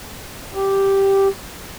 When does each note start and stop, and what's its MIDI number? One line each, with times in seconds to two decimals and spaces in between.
0.55 1.28 67